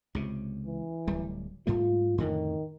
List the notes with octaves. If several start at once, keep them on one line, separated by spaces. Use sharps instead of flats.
C#2 C3
E3
D1 G3
G#2 G3 A3 F4
F2 A2 D3 D#3